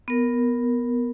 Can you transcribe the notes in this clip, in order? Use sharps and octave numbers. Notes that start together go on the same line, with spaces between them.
B3 A#4